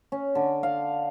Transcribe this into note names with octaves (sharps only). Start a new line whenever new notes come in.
C#4
D3
F5